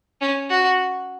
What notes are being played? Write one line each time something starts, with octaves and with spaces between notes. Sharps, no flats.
C#4
F#4